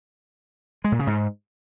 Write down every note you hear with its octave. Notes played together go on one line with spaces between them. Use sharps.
G#3
A#2
C#3
G#2